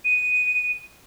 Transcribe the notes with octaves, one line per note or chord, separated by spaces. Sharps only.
D#7